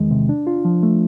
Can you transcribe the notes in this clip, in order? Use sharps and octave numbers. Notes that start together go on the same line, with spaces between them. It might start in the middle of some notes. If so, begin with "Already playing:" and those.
Already playing: E2 D#3 G#3
C3
D4
F4
F3
A3